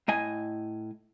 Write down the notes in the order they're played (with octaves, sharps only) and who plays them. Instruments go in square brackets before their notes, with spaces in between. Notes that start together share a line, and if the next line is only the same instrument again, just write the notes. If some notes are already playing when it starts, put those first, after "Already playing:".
[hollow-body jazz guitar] A2 D#5 G#5